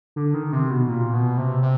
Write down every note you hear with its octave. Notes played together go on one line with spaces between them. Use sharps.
D3
D#3
C3
B2
A#2
B2
C3
C3